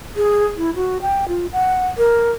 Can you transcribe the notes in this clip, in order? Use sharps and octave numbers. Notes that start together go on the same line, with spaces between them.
G#4
E4
F#4
G5
F4
F#5
A#4